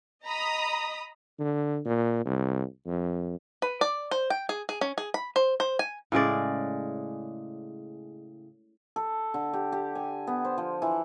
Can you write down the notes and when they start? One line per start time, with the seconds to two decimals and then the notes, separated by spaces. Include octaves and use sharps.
0.25 D#5 A#5 B5 D#6
1.39 D3
1.85 A#2
2.25 C2
2.86 F2
3.62 B4
3.81 D5
4.11 C5
4.30 G5
4.49 G#4
4.69 G#4
4.81 C#4
4.98 G#4
5.14 B5
5.36 C5
5.60 C5
5.79 G#5
6.12 A2 C#3 G#3 D5
8.96 A4
9.34 D3
9.53 G4
9.72 G4
9.95 G#5
10.27 B3
10.45 C5
10.58 F3
10.82 E3